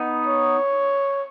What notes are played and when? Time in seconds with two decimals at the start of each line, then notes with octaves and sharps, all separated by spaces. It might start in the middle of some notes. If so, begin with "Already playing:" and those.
Already playing: B3 D#4
0.27 C#5